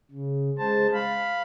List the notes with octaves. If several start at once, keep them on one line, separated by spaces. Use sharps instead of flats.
C#3
G#3 C5 A5
F5 B5